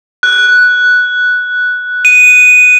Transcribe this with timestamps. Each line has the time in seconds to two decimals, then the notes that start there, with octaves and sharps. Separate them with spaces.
0.23 F#6
2.05 D#7